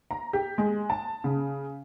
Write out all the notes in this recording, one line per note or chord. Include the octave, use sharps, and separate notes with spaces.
A#5
G4
G#3
A5
C#3